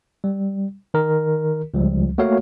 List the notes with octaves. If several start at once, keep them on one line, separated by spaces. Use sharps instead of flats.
G3
D#3 A#4
C#2 F3 G3
A3 A#3 F#4 C#5 F5